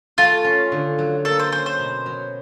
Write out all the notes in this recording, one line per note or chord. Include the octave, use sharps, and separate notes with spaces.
A3 F4
C#4
D3
F#3
A#3 A4
C5
C#4 C5
C5
B2
F#3